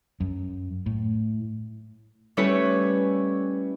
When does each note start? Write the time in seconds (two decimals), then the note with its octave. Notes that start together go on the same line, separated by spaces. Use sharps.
0.20 F#2
0.86 A2
2.37 G3 A3 C#4 E4 B4 C#5